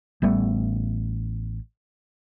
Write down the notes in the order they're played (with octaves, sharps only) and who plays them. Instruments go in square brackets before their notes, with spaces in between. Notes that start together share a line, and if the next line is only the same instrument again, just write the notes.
[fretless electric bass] A1 G3 A3 B3